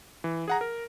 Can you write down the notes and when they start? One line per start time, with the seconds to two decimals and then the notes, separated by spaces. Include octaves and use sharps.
0.24 E3
0.48 G#4 F#5 A#5
0.61 A#4